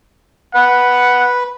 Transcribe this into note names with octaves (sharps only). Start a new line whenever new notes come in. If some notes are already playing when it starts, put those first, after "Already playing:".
B4 F#5